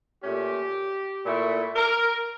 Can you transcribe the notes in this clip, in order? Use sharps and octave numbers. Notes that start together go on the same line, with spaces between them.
A#2 A3 C#4 G4
A#2 A3 E4
A#4